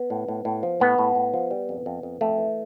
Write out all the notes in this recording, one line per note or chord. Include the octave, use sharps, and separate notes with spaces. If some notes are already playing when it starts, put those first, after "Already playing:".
Already playing: B3
A2
A2
A2
F3
A2 B3
A2
A2
F3
G3
F2
F2
F2
F2 A3
E3